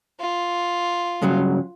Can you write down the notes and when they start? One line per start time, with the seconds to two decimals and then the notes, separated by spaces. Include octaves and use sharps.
0.20 F4
1.22 G2 C#3 F#3